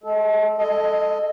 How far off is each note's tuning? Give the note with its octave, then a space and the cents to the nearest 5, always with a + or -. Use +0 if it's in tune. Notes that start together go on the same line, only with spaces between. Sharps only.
G#3 +35 A4 -15
G#3 -25 A4 +0 D#5 +10